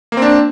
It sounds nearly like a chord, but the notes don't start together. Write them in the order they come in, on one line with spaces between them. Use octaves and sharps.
A#3 C4 D4